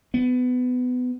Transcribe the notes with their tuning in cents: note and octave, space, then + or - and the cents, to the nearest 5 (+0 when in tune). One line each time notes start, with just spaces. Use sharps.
B3 +20